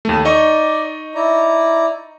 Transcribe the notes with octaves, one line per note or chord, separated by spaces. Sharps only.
D#2 A3
D#4 D5 D#5 C#6
E4 D5 A#5